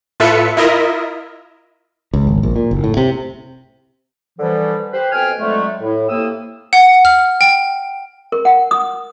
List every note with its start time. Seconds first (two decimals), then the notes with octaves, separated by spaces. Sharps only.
0.20 A2 F4 A4 B4 E5 C#7
0.57 E4 F4 A#4 D#5 E5
2.13 C#2
2.27 G#1
2.43 A#1
2.56 A#2
2.71 F#1
2.84 A2
2.97 C3
4.39 D3 E3 F3 G3
4.92 G4 B4 C5
5.12 F2 B2 G5 G#5 F6
5.39 F2 D3 F#3 G#3 A3
5.81 A2
6.09 A2 C3 A#3 D#6 E6
6.73 F#5
7.05 F6
7.41 G5
8.32 A#4
8.45 F#5
8.71 D#6